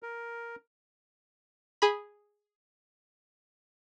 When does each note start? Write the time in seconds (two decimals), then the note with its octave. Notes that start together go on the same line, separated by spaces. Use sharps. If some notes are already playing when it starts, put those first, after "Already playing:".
0.03 A#4
1.82 G#4 B5